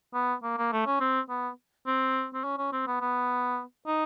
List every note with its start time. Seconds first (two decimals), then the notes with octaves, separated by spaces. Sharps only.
0.14 B3
0.43 A#3
0.58 A#3
0.72 A3
0.86 C#4
1.00 C4
1.29 B3
1.87 C4
2.34 C4
2.44 C#4
2.58 C#4
2.72 C4
2.87 B3
3.01 B3
3.87 D#4